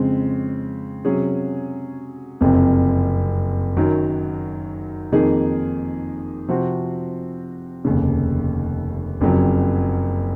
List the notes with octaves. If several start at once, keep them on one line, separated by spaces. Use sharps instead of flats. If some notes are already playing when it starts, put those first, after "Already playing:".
Already playing: F2 C#3 G#3 C4
C3 F#3 C#4 G#4
F#1 F2 C3
F#2 D#3 F#3
F2 D#3 A#3 D#4 G#4
C3 F3 C4 F#4
F1 D#2 C#3
F#1 F2 C#3 F#3